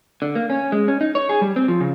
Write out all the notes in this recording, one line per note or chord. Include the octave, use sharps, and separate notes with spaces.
D3
A#3
C#4
G#3
C#4
D#4
C#5
G#4
G3
C4
F3
C#3